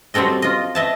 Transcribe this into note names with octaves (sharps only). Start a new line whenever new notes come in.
F#3 G3 C4 A4 D#5
F4 D#5
D#5 E5 A5